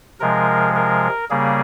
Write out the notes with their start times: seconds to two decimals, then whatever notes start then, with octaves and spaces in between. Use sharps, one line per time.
0.20 C3 F3 G#3 A#4
0.75 A#4
1.30 C#3 G3 A#3 G#4